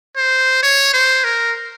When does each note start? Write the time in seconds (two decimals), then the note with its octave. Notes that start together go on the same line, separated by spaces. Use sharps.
0.16 C5
0.63 C#5
0.94 C5
1.24 A#4